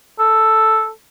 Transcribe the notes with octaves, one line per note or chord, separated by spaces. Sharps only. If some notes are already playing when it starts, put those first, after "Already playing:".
A4